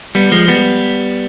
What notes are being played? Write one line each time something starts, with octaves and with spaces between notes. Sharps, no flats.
G3 B3
F3 G#3
G3 B3